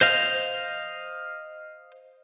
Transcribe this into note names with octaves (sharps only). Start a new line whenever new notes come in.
C5 D#5 F5